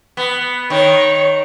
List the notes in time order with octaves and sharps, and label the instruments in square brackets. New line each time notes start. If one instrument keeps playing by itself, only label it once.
[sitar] B3
[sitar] D#3 [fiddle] C#5